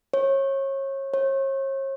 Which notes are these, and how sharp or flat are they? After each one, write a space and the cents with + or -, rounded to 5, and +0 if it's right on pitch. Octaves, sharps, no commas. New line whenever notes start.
C#5 -30
C#5 -40